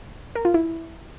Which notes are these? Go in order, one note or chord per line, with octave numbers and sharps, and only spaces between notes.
A#4
F4
E4